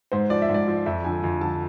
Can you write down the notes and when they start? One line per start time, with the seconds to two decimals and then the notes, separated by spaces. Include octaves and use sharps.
0.12 G#2 C5
0.30 F3 D5
0.42 E5
0.49 G#2
0.54 D5
0.68 F3
0.86 F2 E5
1.04 D3 F3 G#5
1.23 F2 G#5
1.41 D3 F3 A5